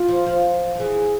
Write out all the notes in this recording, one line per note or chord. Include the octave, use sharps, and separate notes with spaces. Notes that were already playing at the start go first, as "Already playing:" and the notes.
Already playing: F4
F3
F3
F3
E3 G#4